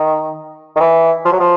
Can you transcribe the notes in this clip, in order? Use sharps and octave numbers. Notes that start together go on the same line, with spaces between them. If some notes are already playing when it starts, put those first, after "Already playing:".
Already playing: D#3
D#3
E3
F3
F#3
F3